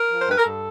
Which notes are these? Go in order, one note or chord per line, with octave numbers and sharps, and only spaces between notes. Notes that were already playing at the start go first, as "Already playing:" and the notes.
Already playing: A#4
F3
C5
G2 B4
A#4
G2 A4